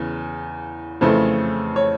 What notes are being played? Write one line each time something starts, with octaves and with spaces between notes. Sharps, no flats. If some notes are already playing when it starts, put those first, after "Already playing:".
Already playing: E2 C#3
F2 C#3 E3 A3 C5
C#5